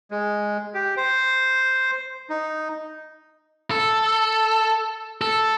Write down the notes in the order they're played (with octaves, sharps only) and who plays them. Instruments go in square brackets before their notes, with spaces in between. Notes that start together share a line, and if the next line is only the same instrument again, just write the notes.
[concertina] G#3
G4
C5
D#4
[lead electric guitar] A4
A4